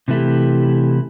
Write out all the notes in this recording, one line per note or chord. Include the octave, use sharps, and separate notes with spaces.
C3 E3 A3 E4 G4